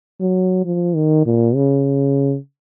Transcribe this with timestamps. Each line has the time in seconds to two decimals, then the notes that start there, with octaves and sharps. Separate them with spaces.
0.21 F#3
0.65 F3
0.95 D#3
1.26 A#2
1.55 C#3